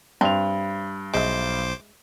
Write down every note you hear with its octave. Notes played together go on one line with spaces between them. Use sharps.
G2 C4 F7
B1 G#3 C5 E5 D6